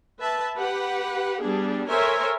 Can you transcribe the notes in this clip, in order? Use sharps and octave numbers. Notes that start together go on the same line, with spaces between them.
B4 E5 A5
G4 B4 F#5
G3 B3 D4 G#4
A4 A#4 C5 C#5 E5 G#5